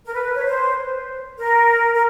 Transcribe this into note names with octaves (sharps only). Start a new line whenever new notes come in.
A#4
B4
C#5
C5
A#4
A#4